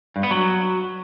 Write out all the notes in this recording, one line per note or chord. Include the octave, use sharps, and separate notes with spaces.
G2
B3
F#3